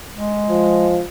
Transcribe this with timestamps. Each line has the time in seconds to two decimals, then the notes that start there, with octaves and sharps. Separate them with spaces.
0.15 G#3
0.49 F3